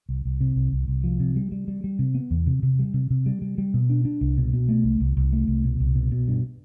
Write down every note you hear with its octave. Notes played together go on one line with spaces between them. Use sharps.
C2
C2
C3
C2
C2
C2
F3
C3
G3
G3
G3
G3
C3
B3
E2
C3
C3
G3
C3
C3
G3
G3
G3
B2
D4
D4
C2
B2
B2
A3
C2
C2
C2
A3
C2
B2
C2
B2
B2
G2